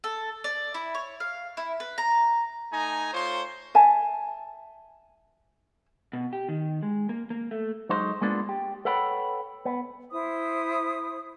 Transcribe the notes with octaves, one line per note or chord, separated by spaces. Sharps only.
A4
D5
E4
C#5
F5
E4
B4
A#5
A3 D#4 G#5 A#5
A3 F4 C5 C#5 C6
E5 G#5 A5
B2
G4
D#3
G#3
A#3
A#3
A3
F#3 G#3 D#4 C5
G#3 A#3 B3 D4 F4
G4
A4 B4 C#5 F#5 G5 B5
B3
E4 C5 D#6